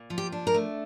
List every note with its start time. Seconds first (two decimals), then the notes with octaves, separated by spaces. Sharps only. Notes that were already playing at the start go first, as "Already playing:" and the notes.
Already playing: A#2
0.10 F3
0.18 G4
0.32 D4
0.47 A#4
0.54 A3